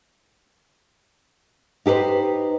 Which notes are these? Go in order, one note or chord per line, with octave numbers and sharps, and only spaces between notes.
D#4 G4 A4 B4 C5